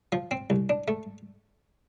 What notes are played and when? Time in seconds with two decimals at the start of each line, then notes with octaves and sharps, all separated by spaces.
0.12 F3
0.31 C4
0.50 C2
0.70 D4
0.88 A3